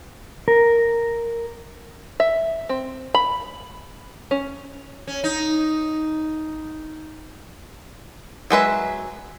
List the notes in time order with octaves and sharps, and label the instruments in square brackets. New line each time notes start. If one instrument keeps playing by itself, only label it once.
[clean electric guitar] A#4
[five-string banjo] E5
C4
B5
C#4
[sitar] C#4
D#4
[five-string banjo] F#3 G#3 B4 E5